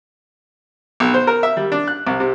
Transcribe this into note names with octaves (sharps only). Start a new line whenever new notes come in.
B1
C5
A#4
E5
G3
D4
F#6
C2
C3